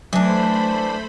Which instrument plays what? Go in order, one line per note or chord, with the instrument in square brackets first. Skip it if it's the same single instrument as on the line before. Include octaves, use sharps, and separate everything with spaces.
[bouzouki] E3 D4 [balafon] F#3 [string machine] A3 C5 B5